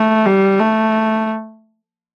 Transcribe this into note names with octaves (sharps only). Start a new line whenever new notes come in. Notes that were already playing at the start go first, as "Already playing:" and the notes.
Already playing: A3
G3
A3